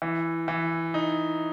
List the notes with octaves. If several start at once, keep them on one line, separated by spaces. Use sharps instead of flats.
E3
E3
D#4